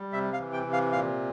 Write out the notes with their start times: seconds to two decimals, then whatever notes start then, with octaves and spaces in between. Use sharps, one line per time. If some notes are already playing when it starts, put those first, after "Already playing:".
Already playing: G3
0.13 C3 E5
0.33 F5
0.39 E3
0.53 G5
0.65 C3
0.73 F5
0.92 A#2 F5